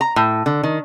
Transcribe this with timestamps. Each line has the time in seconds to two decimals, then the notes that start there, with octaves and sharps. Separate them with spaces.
0.01 A#5
0.16 A2
0.46 D3
0.63 D#3